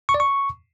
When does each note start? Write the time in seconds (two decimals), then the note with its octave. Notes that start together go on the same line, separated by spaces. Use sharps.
0.09 C#6
0.14 D5
0.20 C#6